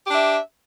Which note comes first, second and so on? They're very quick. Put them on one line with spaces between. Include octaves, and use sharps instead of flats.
G4 D4 E5